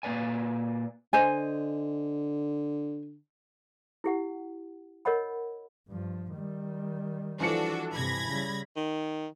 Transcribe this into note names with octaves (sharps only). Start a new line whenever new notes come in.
A#2 A#3 B4 D5 G#5
D3 C5 D#5 G#5
E4 G4 F#5
A#4 C#5 D#5 F#5 B5
G2 F3
D#3 G3
E3 F3 D4 F#4 A4 C#7
G2 C3 B5 G#6 A#6
C#3 G3
D#3